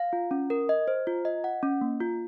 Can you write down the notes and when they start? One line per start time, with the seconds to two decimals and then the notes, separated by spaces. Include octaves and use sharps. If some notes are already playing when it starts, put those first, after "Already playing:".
Already playing: F5
0.13 F4
0.31 C#4
0.50 A#4
0.69 D#5
0.88 C5
1.07 F4
1.25 D#5
1.44 F#5
1.63 C#4
1.81 A#3
2.01 F4